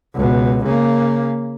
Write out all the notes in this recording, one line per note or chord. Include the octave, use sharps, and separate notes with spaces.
C#2 B2
C#3 A#3